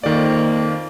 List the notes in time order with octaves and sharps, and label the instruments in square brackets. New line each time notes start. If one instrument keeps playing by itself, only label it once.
[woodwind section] F2 A#3 [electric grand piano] D#3 D5